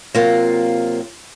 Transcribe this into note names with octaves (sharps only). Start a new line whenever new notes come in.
C3 F#3 A#3 F4